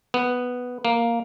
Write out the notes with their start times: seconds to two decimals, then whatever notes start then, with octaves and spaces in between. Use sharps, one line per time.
0.14 B3
0.85 A#3